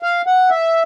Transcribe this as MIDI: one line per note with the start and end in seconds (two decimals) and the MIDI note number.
0.03 0.22 77
0.27 0.50 78
0.50 0.83 76